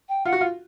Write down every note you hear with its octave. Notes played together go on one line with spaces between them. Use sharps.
G5
F4 F#5
F#4
F4